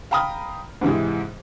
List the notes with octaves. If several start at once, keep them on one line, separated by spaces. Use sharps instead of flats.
F5 G5 A#5 B5 D#6 F6
G#2 C3 E3 G#3